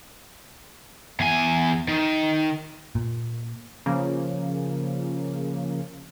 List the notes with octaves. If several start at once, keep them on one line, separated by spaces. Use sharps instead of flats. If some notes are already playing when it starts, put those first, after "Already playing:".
E2 G#5
D#3
A#2
C#3 F3 A#3